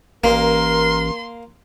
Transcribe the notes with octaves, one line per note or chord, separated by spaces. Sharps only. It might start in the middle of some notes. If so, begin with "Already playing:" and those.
A1 A#3 A#4 C6